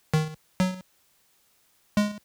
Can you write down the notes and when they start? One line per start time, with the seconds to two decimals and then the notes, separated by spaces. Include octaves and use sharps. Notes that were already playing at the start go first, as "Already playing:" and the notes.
0.14 D#3
0.60 F#3
1.97 G#3